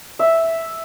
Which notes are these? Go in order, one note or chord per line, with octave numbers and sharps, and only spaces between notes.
E5